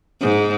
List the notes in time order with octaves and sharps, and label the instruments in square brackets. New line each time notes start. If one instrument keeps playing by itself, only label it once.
[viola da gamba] G#2